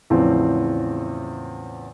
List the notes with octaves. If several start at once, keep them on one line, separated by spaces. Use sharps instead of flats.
E2 A2 C#3 E3 F3 C4